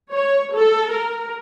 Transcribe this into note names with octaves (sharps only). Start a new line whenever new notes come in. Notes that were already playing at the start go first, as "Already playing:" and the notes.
C#5
A4
A#4